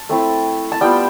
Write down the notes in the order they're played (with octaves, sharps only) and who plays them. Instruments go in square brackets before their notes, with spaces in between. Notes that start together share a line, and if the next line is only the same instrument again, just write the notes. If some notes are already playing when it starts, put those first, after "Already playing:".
Already playing: [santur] A5
A3 C4 E4
A5
G3 B3 F4 G5